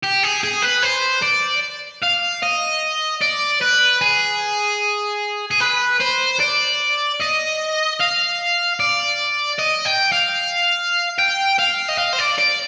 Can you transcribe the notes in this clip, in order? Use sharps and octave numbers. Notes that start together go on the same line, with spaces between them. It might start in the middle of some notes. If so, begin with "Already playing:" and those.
G4
G#4
G#4
B4
C5
D5
F5
D#5
D5
B4
G#4
G#4
B4
C5
D5
D#5
F5
D5
D#5
G5
F5
G5
F5
D#5
F5
C5
D5
D5